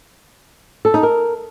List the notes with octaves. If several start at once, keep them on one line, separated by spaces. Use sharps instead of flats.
A4
D#4
A#4